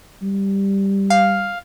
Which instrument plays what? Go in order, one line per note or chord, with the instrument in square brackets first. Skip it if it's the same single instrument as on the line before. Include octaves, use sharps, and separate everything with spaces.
[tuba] G3
[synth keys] F5